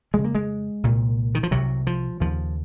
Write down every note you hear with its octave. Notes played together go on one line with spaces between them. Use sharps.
F2 C#3 G#3
A#3
G#3
C2 A#2
D#3
F3
C2 C3 F#3
F3
D#2 C#3 F3